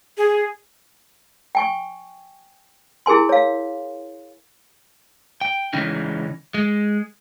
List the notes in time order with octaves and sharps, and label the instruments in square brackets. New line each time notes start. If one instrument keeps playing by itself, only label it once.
[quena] G#4
[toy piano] G5 G#5 C#6
E4 G#4 A#4 G#5 C6
C#5 F5
[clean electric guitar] G5
C#3 E3 G#3 C#4 D#4
G#3